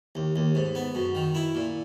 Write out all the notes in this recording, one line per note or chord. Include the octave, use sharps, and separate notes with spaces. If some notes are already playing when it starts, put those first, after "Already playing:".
D#2
D#2
G#2
B3
F#2
D#3
E4
A#2